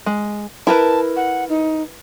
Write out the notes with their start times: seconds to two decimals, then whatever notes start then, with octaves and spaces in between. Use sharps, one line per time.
0.06 G#3
0.67 E4 A#4 B4 A5
1.16 F#5
1.49 D#4